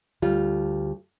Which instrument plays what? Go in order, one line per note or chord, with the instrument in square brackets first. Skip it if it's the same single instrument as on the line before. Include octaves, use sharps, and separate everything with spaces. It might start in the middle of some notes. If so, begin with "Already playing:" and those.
[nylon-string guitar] D2 G3 F4